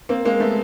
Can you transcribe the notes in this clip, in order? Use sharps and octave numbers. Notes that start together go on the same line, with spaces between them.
A#3 C4
G#3 A#3
A3 B3